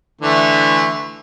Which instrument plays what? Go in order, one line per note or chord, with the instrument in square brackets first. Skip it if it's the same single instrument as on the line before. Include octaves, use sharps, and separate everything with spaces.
[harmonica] D3 E3 A3